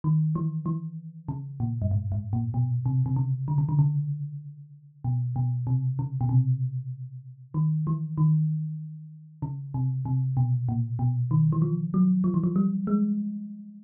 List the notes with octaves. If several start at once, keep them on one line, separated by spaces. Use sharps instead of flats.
D#3
E3
E3
C#3
A#2
G2
G#2
G#2
A#2
B2
C3
C3
C#3
D3
C#3
D3
C#3
B2
B2
C3
C#3
B2
C3
D#3
E3
D#3
C#3
C3
C3
B2
A#2
B2
D#3
E3
F3
F#3
F3
E3
F3
G3
G#3